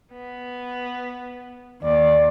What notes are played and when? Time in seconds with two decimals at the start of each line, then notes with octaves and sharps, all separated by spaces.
0.12 B3
1.82 D#2 D5